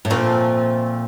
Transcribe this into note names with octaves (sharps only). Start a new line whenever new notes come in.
A2
A#2 F3 A3 C4 F4